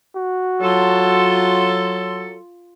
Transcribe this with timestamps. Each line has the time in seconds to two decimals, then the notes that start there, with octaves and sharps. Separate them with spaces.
0.16 F#4
0.61 F#3 F4 A4 C6